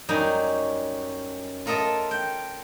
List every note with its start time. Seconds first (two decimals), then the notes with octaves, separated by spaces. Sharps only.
0.09 F#2 G3 C#4 D#4 G#5
1.66 F4 A4 A#4 D#5 E5
2.11 G5